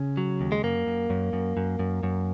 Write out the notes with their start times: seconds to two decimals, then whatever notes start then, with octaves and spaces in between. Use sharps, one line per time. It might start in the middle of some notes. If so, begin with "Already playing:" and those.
Already playing: C#3 C#4
0.17 F#3
0.41 D#2
0.52 G#3
0.63 F#2 A#3
0.87 F#2
1.10 F#2
1.33 F#2
1.57 F#2
1.79 F#2
2.03 F#2